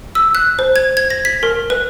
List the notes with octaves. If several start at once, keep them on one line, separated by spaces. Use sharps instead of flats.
E6
F#6
C5
G#6
G#6
A#6
B6
A#4
B4